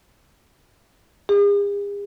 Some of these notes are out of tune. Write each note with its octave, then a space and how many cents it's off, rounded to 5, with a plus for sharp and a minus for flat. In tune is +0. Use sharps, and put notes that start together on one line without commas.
G#4 -45